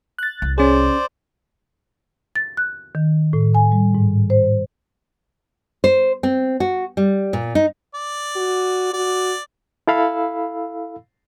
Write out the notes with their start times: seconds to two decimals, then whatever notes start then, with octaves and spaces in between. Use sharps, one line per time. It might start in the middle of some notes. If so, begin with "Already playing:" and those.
0.18 F#6 A6
0.42 C2
0.58 C#4 G#4 C5 D5
2.36 A6
2.57 F#6
2.95 D#3
3.33 A2
3.55 G#5
3.72 G3
3.95 G#2
4.30 C5
5.84 C5
6.23 C4
6.60 F#4
6.97 G3
7.33 A#2
7.55 D#4
7.95 D5
8.36 F#4
8.94 F#4 D5
9.88 E4 A4 F5 B5 E6